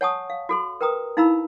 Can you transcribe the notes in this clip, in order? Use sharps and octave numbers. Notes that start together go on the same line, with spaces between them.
C#5 F#5 G#5 A5 C#6 D#6
F5
F#4 A4 C6
A#4 B4 G5 A#5 D#6
D#4 E4 F5 A#5 B5 E6